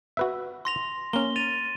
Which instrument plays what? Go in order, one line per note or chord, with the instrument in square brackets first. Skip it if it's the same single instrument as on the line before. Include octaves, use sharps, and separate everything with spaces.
[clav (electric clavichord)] F#4 B4 E5
[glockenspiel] C6 A#6 F7
[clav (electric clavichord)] A#3 C#4 [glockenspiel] G7
[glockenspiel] A6 D#7 F7